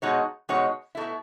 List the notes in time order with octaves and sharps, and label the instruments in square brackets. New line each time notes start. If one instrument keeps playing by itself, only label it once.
[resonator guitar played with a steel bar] B2 G#3 D#4 F#4 C#5
B2 G#3 D#4 F#4 C#5
B2 A3 E4